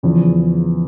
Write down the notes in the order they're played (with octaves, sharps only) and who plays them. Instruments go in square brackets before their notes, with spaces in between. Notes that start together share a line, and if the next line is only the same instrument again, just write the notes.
[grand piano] E2 C#3 F3